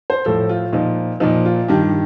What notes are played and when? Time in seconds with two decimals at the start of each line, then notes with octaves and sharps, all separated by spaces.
0.10 C5
0.26 A2 F3 A4
0.49 F4
0.73 A#2 F3 D#4
1.20 A#2 F3 D#4
1.45 F4
1.68 G2 D#3 G4